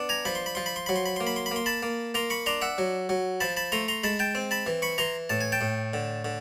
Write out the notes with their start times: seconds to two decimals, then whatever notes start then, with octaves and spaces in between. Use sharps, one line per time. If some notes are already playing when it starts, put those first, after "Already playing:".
Already playing: B3 D4
0.09 G#5 A#5
0.25 F3 B5
0.35 C6
0.46 B5
0.55 F3 C6
0.66 B5
0.76 C6
0.86 F#3 B5
0.96 C6
1.06 B5
1.16 A#3 C6
1.27 B5
1.36 C6
1.46 B5
1.51 A#3 C6
1.66 A5 B5
1.82 A#3
2.14 A#3 A#5 C6
2.30 B5 C#6
2.46 D4 A#5 C6
2.62 E5 F#5
2.78 F#3
3.09 F#3
3.40 F3 A5 B5
3.57 A5 B5
3.72 A3 A#5 C6
3.88 A#5 C6
4.04 G#3 A5 B5
4.19 G5 A5
4.35 C4
4.51 A5 B5
4.66 E3
4.82 B5 C#6
4.98 E3 A#5 C6
5.30 A2 A5
5.41 G#5
5.52 G5 A5
5.61 A2
5.93 D3
6.25 D3